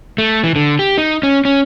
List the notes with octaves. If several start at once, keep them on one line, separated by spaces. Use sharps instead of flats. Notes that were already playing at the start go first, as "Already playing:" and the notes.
A3
E3
D3
G4
D#4
C#4
C#4